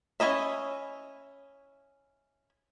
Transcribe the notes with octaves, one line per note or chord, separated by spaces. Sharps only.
C#4 E4 D#5 E5